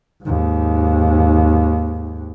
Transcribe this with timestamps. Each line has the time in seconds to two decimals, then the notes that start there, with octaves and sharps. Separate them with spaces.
0.23 D#2 G#2